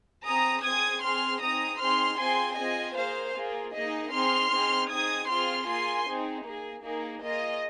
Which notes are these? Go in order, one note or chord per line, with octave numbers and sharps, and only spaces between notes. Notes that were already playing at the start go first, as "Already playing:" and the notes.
C4 G#4 A#5 D#6
C4 G#4 D#6 G#6
C4 G#4 C6 F6
C4 D#4 G#4 A#5 D#6
C4 D#4 G#4 C6 F6
C4 F4 G#4 G#5 C6
C4 F4 G#4 D#5 G#5
A#3 G#4 C5 F5
A#3 F4 G#4
A#3 D#4 G#4 D#5
C4 D#4 G#4 C6 F6
C4 D#4 G#4
C4 D#4 G#4 D#6 G#6
C4 F4 G#4 C6 F6
A#3 F4 G#4 G#5 C6
C4 D#4 G#4
A#3 G#4
A#3 D#4 G#4
A#3 F4 G#4 D#5